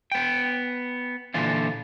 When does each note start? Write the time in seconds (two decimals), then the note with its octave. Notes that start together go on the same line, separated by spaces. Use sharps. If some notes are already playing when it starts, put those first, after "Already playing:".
0.12 B3 G5
1.34 A#2 D3 E3 F4